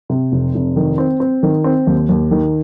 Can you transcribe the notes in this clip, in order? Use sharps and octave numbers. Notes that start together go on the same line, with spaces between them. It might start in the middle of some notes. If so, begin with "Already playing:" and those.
C3
F1
F1
D#3
C4
C4
D#3
C4
D#2
D#2
D#3